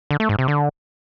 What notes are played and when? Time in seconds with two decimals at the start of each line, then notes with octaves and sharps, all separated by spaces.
0.11 D3
0.20 A3
0.29 G#2
0.39 C3
0.48 D3